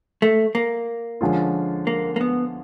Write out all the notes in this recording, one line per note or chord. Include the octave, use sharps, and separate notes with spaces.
A3
A#3
D3 F3 G#3 C#4 F4
A#3
A#3
B3